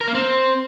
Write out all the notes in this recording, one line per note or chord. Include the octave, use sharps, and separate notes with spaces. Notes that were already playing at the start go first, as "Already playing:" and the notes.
A#4
A#3
C4